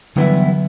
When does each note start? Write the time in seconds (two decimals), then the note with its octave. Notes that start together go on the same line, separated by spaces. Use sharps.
0.16 G2 D3 E3 F#3 B3 E4